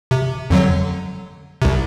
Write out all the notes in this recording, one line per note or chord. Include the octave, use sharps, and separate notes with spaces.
C3
F2 D3 F#3
C2 C3